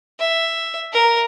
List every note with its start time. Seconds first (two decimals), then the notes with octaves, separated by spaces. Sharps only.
0.19 E5
0.93 A#4